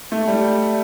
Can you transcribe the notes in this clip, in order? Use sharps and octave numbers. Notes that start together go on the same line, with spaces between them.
A3
G3